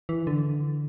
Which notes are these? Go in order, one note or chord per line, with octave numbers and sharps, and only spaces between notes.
E3
D3